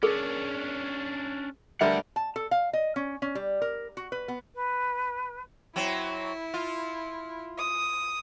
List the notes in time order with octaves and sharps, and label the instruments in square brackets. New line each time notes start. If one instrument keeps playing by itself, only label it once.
[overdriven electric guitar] C#4 D4 [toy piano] G#4 A#4
[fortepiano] D3 G3 A#4 [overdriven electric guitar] A3 F#5 [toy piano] E5
[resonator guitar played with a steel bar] A5
A4
F5
D#5
C#4
C#4
G3
A#4
F#4
B4
B3
[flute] B4
[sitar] F#3 C4 [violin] E4
[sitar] F4
[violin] D#6